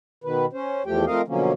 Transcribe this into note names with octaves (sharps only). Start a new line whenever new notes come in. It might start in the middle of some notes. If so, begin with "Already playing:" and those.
B2 D#3 B4
C#4 C5
E2 F3 A3 G4 G5
F3 A3 C4 A#4 D#5 F5
B2 D3 F3 F#3 A#3 C#4